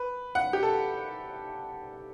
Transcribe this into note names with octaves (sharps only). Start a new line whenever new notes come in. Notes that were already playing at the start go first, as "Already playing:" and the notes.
Already playing: B4
F#5
G4
A4